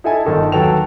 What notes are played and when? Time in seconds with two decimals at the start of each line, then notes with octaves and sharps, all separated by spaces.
0.04 D#4 E4 A4 E5 G#5
0.25 G1 D#3 A4 D#5
0.52 D#2 F#3 A4 B4 G5 F7